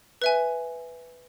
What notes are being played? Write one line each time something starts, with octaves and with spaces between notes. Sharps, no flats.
B4 E5 G#5